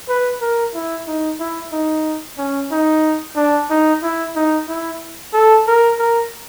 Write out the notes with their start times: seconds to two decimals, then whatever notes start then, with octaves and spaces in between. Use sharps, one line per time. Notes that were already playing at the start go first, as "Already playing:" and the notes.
0.08 B4
0.41 A#4
0.74 E4
1.07 D#4
1.40 E4
1.72 D#4
2.38 C#4
2.71 D#4
3.36 D4
3.70 D#4
4.03 E4
4.36 D#4
4.68 E4
5.33 A4
5.67 A#4
5.99 A#4